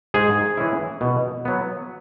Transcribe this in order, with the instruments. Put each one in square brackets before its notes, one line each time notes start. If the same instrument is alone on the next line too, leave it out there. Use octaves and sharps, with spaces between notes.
[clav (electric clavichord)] G#2 G#4
E3 C#4 E4
B2
F#3 B3